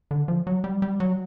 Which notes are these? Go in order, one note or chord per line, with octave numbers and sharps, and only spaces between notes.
D3
F3
F#3
G3
G3
F#3